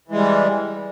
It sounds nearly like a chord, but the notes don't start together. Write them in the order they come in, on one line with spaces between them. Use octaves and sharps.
E3 G#3 G3